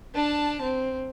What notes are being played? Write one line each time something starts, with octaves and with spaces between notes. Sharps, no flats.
D4 A5
C4